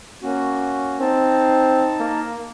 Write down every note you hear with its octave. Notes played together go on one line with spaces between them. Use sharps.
A#3 C#4 F#4
C4 D#4 A5
A#3